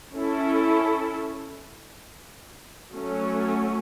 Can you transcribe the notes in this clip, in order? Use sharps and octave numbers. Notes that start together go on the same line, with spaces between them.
C#4 E4 A4
F#3 A3 C#4